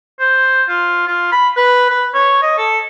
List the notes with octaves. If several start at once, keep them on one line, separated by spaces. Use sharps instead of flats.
C5
F4
F4
B5
B4
B4
C#5
D#5
A4